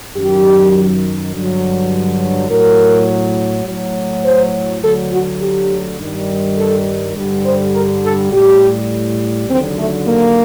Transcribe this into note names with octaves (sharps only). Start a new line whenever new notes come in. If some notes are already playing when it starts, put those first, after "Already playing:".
F#2 D#3 F#3 G4
G2 D3 F#3
A2 F#3 A#4
A2 F#3
C5
D2 D3 F#3 A4
F#4
G4
G2 D#3 G3
A4
G2 D3 G3
C5
A#4
A4
A2 G3 G4
D#2 D3 F#3 C4
A3
A#3